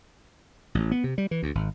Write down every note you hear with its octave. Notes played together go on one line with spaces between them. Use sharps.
A1
B3
C3
G3
E3
D2
G#1